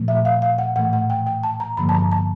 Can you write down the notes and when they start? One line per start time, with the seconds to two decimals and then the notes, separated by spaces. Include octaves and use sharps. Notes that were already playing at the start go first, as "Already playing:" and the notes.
Already playing: A#2 F3 A3
0.08 E5
0.25 F5
0.42 F5
0.58 F#5
0.76 A2 E3 A3 F#5
0.93 F#5
1.10 G5
1.27 G5
1.44 A5
1.60 A#5
1.77 G2 D3 F3 A#3 B5
1.89 A5
1.94 A#5
2.12 A5